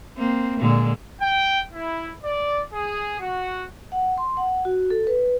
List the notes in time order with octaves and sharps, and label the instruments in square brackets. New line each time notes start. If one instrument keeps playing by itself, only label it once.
[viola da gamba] A#3 C4
A#2 D3 G#3
[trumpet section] G5
E4
D5
G#4
F#4
[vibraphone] F#5
C6
F#5
F#4
A4
B4